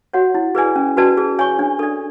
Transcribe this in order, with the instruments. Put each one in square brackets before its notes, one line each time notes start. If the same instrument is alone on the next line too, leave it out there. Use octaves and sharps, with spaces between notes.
[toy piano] F#4 C#5 F#5
E4
G#4 B4 D5 G#5
C#4
F#4 B4 D5 A5
G#4
C#5 G#5 C#6
D4
A4 D5